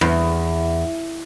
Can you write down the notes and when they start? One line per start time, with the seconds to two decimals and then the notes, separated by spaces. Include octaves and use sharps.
0.01 E2